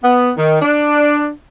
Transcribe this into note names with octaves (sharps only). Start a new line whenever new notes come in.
B3
D#3
D4